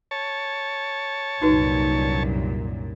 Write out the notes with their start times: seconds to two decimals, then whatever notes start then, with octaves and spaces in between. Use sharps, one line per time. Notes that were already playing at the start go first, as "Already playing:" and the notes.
0.11 C#5 A5
1.41 C2 F#2 A#2 D#4 F#4 B4